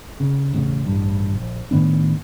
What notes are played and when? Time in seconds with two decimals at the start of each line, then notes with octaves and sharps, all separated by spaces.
0.20 C#3
0.54 E1 A1 C#3
0.86 A1 G2
1.35 A#1
1.71 A2 D#3 B3 D4